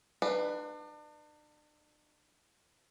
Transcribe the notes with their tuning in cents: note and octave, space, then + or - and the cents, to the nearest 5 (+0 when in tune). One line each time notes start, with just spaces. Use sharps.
D4 +40 B4 +5